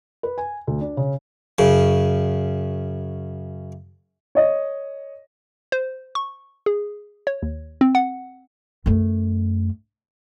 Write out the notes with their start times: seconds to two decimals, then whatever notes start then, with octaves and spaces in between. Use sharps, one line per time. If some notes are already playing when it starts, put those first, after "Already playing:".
0.23 B4
0.38 G#5
0.67 D2
0.81 D4
0.97 C#3
1.59 F#2 C#3
4.35 C#5 D#5
5.72 C5
6.15 C#6
6.66 G#4
7.27 C#5
7.42 D#2
7.81 C4
7.95 F#5
8.86 F#2 A3